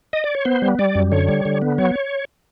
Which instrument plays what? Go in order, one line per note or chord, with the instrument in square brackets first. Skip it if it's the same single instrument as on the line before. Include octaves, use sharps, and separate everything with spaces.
[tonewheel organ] D#5
D5
C#5
B3 C5
G3
G3 D5
F#2
D3 C#5
G3
D3
B3
F#3 C#5